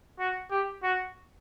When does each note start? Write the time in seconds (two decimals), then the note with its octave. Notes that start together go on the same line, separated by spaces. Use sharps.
0.19 F#4
0.50 G4
0.83 F#4